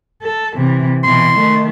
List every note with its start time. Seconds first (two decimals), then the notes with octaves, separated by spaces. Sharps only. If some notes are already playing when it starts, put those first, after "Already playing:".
0.22 A4
0.55 C3 E3
1.04 B2 E3 C6
1.36 D#3 A3